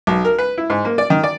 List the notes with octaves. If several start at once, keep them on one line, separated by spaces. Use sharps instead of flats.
B1
A#4
B4
E4
G#2
A#3
D5
D#3
D5